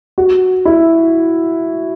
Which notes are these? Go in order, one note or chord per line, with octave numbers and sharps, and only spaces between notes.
F#4
E4